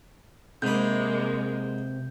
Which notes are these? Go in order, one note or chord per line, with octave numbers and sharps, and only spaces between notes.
G#2 C3 G#3 A#3 B4 G6